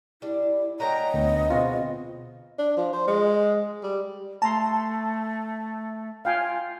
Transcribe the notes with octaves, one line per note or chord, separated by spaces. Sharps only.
G3 D4 E4
F#3 A3 A#4 D#5 G5 A#5
D2 B3
B2 G#3 C4 F4 F#4
D4
F3
C5
G#3
G3
A3 A5 A#5 C6
F4 F5 G5 G#5